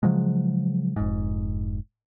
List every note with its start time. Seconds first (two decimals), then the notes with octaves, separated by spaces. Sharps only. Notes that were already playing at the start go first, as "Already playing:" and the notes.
0.03 C#3 F3 F#3 G#3
0.96 F1 G#2